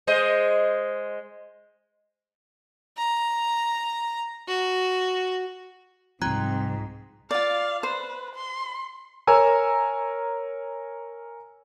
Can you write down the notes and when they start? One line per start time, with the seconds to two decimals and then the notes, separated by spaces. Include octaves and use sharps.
0.07 G#3 C5 D#5
2.98 A#5
4.48 F#4
6.22 C2 G#2 F3 C4 A#5 F#6 G#6
7.31 F4 D5 F5
7.83 B4 C5
8.35 C6
9.27 A#4 C#5 G#5 A#5 E6